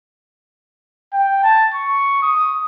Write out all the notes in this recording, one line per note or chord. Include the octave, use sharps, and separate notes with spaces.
G5
A5
C#6
D#6